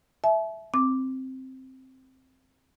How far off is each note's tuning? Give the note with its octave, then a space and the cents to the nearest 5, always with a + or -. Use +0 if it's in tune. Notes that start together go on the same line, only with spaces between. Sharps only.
E5 +0 A5 -40
C4 +0 D6 +0